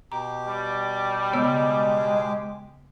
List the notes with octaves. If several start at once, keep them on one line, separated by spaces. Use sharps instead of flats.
B2 G4 A#5 D6
G3
C#3 G#3 B3 E6